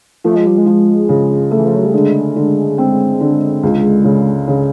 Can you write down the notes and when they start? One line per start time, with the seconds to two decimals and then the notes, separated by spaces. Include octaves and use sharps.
0.24 F3 A3
0.36 G#3
0.47 G3
0.58 G#3
0.66 F3
1.09 C#3
1.51 A3
1.57 E3
1.66 F3
1.76 F#3
1.85 G3
1.94 D3 G#3
2.36 D3
2.78 C4
3.20 D3
3.63 C#2
4.04 C#3
4.48 C#3